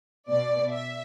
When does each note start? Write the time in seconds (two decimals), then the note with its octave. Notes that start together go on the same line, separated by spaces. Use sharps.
0.30 B2 D5
0.71 E5